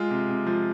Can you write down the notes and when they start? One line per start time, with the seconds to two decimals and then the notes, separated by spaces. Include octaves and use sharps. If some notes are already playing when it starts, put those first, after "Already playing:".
Already playing: G#3 F4
0.10 C3
0.29 C3
0.47 F3